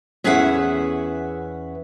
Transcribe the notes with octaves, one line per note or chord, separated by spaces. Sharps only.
E2 C#4 G#4 B4 E5 F#5